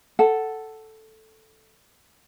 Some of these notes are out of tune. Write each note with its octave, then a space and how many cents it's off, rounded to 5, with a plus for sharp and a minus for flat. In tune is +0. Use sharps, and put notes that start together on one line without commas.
A4 +0 F#5 +10